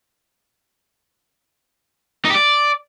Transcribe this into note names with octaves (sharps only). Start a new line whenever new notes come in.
D#4
G4
D5